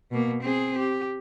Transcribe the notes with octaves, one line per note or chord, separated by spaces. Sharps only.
B2 A#3
C4 G#4
G4